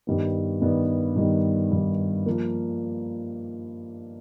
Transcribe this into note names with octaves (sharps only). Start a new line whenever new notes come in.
G2 D#3 G3 B3
G2 D#3 G3 B3
G2 D#3 G3 B3
G2 D#3 G3 B3
F3 A#3